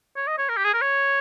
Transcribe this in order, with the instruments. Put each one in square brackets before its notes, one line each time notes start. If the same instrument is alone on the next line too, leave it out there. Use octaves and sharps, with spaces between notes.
[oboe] C#5
D#5
C#5
A#4
G4
G#4
A#4
C#5